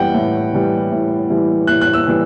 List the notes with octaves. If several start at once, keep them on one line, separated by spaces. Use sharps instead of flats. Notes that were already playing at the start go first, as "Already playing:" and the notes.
Already playing: E3 G3 F#5 G5
A2
E3 G3
A2
E3 G3
A2 F#6
F#6
E6
E3 G3